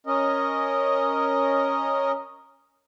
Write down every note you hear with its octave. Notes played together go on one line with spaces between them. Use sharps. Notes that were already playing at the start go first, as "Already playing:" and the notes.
C#4 A#4 D#5